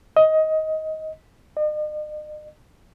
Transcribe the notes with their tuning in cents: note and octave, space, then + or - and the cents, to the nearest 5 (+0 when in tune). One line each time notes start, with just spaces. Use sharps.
D#5 +15
D#5 -45